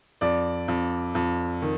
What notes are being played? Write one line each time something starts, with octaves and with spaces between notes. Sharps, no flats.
F2 D5
F2
F2
D#3